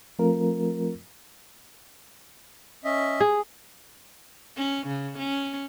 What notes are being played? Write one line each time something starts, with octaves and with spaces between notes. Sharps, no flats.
F3 A3 C4 F4 A#4
C#4 D#5 E5
G#4
C#4
C#3
C#4